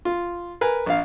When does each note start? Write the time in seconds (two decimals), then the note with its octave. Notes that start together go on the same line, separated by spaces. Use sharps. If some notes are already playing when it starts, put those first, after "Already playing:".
0.05 F4
0.61 A#4 B4 G#5
0.86 A#1 F5